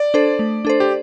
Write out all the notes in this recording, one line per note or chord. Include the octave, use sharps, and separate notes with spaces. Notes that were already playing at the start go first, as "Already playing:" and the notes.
Already playing: D5
D4 A4 C5
A3
D4 A4 C5
G4